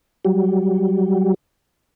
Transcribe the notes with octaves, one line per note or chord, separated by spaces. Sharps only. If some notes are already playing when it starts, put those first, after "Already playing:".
F#3 G3